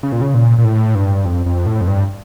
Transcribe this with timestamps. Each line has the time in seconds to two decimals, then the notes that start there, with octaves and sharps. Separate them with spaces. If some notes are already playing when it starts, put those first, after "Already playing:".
0.03 C#3
0.12 A#2
0.21 C#3
0.34 A#2
0.58 A#2
0.65 A2
0.95 G2
1.25 F2
1.46 F2
1.66 A2
1.81 F2
1.87 G2